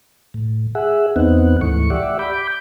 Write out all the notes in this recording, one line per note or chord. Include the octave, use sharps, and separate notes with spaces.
A2
G#4 E5 F#5
E2 B3 C4 D#4 F#5
D2 G#2 E3 A3 C#6
G4 D5 E5 F#5
B5 D6 G6